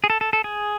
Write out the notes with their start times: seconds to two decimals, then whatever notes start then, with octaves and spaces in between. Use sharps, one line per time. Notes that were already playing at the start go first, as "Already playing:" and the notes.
0.04 G#4
0.10 A4
0.21 A4
0.33 A4
0.44 G#4